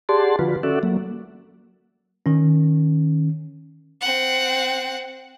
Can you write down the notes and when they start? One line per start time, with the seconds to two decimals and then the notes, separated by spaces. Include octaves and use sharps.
0.09 G4 G#4 D5 F#5 A5 C6
0.39 D3 F3 F4 F#4 B4
0.63 C#4 F#4 A4 D5 E5 F#5
0.83 F#3 A#3
2.26 D#3 C#4
4.01 C4 F#5